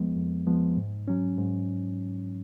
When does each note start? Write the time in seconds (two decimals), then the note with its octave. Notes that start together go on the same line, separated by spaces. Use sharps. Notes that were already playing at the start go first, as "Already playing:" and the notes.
Already playing: F2 F3 G#3 B3
0.16 F2
0.46 F3 G#3 B3
0.77 G#2
1.08 F#3 C#4
1.38 G#2